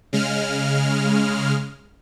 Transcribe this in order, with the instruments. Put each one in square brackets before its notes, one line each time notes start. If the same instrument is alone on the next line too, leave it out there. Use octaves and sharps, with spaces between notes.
[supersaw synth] C#3 G#3 F6